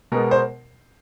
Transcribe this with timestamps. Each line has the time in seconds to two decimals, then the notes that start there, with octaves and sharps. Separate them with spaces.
0.12 B2 G#3 B3 A#4
0.31 C5